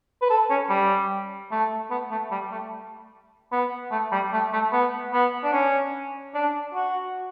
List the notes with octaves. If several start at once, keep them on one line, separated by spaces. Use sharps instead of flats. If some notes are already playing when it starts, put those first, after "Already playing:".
B4
A4
C#4
G3
A3
B3
A3
G3
A3
B3
A3
G3
A3
A3
B3
B3
D4
C#4
D4
F#4